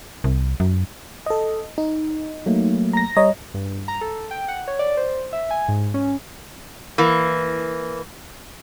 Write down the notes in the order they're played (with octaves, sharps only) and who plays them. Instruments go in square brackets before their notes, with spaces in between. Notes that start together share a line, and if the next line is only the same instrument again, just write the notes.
[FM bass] C2
F#2
[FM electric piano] A4 D#5
D#4
[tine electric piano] F#3 A3 A#3
[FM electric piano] A#5 A#6
[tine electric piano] G3 [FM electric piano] C#5 D#5 A#5
[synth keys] G2
A#5
A4
G5
F#5
C#5
D5
C5
E5
G#5
G#2
C#4
[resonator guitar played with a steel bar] E3 A#3